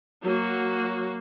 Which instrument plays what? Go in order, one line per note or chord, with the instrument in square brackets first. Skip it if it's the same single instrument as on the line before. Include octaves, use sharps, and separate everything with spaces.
[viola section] F#3 [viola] A#3 F#4